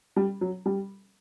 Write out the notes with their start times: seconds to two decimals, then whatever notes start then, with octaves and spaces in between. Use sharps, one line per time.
0.16 G3
0.41 F#3
0.66 G3